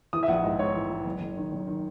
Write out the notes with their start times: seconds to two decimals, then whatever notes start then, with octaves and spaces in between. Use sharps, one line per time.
0.13 E3 D#6
0.23 E5
0.28 A#1 F#5
0.43 G#2 D#5
0.59 G#2 C#5
0.75 E3
0.90 E3
1.05 F#1
1.21 F#1
1.37 D#3
1.52 F#1
1.67 D#3